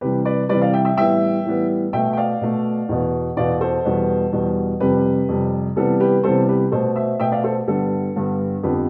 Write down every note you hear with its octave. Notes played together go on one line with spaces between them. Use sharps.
C3 E3 G3 G4 B4
B4 D5
C3 E3 G3 B4 D5
D5 F5
E5 G5
E5 G5
A2 E3 G3 B3 E5 G5
A2 E3 G3 B3
B2 A3 E5 G5
G5
D5 F5
B2 A3
E2 B2 B3
E2 B2 B3 D5 F5
A4 C5
E2 B2 G3 B3
E2 B2 G3 B3
F2 C3 G3 G4 B4
F2 C3 G3
C3 E3 G3 B3 A4
G4 B4
C3 E3 G3 B3 A4 C5
G4 B4
B2 A3 A4 C5
C5 E5
B2 A3 E5 G5
D5 F5
A4 C5
G2 D3 G3 B3 A4
G2 D3 G3 B3
F2 D3 F3 B3 G4 B4